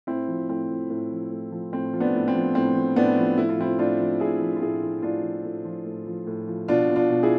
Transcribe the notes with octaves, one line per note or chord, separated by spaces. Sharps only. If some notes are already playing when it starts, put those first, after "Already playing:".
A2 C4 E4
F3
A2 C4
F3
A2
F3
A2
F3
A2 C4
F3
B3 D4
A2
C4
F3
A2 C4
F3
A2 B3 D4
F3
A2 E4
F4
F3 C4 E4
A2 D4 F4
F3
A2 E4 G#4
F3
F4
A2 E4 G#4
F3
A2 D4 F4
F3
A2
F3
A2
F3
A2
F3
B2 D4 F4
B2
D4 F4
B2
E4 G#4